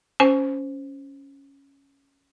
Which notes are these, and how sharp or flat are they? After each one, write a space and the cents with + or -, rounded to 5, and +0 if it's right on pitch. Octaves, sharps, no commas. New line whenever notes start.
C#4 +0 C5 +0 G#5 +25